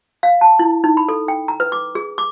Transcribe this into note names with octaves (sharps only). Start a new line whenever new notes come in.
F5
A5
E4
D#4
B5
A4
G5
A#5
B4
D6
G#4
D6